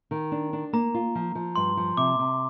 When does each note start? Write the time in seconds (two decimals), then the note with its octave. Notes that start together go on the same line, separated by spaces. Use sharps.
0.11 D#3
0.32 D4
0.53 D4
0.73 A#3 A#5
0.94 F4
1.15 F3
1.35 F3
1.56 G2 C6
1.77 F3
1.97 C3 D6
2.19 C3